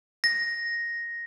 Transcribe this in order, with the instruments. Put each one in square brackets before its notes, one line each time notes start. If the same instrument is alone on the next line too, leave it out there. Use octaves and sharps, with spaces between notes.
[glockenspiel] A#6